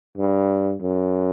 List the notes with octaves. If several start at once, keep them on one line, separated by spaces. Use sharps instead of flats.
G2
F#2